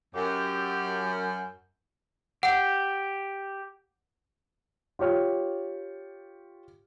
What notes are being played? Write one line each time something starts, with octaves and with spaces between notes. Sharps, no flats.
F#2 G4
G4 F#5
F4 G4 C#5 F6